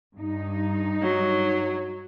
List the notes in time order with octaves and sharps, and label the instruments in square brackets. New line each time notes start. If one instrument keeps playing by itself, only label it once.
[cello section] G2 D#4
[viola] F#3